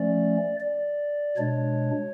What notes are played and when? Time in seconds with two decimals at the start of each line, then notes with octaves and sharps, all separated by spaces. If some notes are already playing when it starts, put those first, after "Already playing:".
Already playing: F3 A3 C#4 D5
0.60 D5
1.37 B2 G#3 D4 C#5